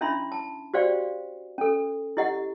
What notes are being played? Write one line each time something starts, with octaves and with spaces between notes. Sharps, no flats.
C#4 D4 E4 E5 B5 C6
A5
F#4 G4 C5 D5 F5 G5
C#4 A4
E4 G4 D#5 F#5